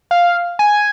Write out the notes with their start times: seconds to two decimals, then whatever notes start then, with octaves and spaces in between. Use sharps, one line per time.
0.11 F5
0.59 G#5